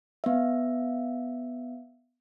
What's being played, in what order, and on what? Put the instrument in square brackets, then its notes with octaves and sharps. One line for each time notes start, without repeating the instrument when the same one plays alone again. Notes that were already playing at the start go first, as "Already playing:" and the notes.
[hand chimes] B3 E5